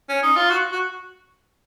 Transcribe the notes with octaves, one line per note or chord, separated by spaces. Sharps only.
C#4
D#4
F4
F#4
F#4